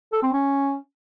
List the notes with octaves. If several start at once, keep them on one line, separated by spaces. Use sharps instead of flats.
A4
C4
C#4